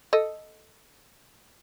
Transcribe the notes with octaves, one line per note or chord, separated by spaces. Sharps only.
A4 D#5